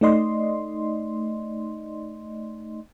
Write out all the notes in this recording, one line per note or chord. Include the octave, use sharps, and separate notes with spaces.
A3 D#4 D5 D#5 C6